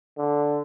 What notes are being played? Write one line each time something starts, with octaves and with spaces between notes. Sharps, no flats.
D3